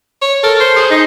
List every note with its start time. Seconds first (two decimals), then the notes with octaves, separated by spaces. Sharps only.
0.21 C#5
0.43 A4 A#4
0.61 C5
0.76 G#4
0.91 D#4